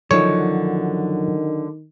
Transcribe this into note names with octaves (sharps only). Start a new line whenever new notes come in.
F#2 D3 D#3 F3 F#3 D#4 C#5